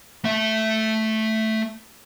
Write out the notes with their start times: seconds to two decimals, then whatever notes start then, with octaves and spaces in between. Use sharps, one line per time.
0.24 A3 E5